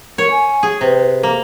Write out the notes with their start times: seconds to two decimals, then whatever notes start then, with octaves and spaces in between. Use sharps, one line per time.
0.18 A#4 C#5
0.31 G#5
0.63 G#4
0.81 C3 B4
1.23 A#3